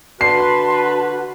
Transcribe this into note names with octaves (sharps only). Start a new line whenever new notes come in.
D3 F#4 B4 A5 C6 C7